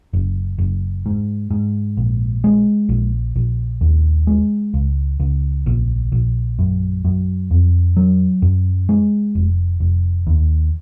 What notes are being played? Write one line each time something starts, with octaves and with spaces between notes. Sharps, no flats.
F#1
F#1
G#2
G#2
A#1
G#3
A#1
A#1
D#2
G#3
C#2
C#2
A#1
A#1
F#2
F#2
F2
F#3
F#2
G#3
F1
F1
D#2